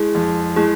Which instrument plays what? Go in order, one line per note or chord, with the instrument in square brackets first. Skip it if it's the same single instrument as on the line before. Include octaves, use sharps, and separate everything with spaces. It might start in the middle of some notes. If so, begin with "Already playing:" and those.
Already playing: [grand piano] G#3 [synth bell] E4 G#4
[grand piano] F2
[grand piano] G#3 [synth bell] E4 G#4